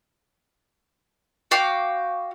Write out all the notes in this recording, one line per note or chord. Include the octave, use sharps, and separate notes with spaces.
F#4 F5 G5 D6